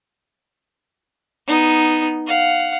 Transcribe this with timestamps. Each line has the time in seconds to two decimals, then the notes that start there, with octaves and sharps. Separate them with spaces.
1.47 B3 D#4
2.27 F5 F#5